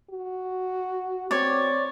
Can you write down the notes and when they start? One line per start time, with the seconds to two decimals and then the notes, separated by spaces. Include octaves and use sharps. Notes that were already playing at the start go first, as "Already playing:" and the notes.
0.10 F#4
1.31 C4 C#5 D5